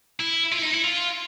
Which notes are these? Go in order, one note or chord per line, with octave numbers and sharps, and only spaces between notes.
E4
F4
E4
D#4
E4
F4